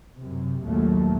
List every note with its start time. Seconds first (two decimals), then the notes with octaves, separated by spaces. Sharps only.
0.19 F#2 C3
0.63 A#1 D#2 A#2 F#3 A3